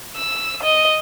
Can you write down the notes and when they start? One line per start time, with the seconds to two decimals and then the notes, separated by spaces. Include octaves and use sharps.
0.14 E6
0.63 D#5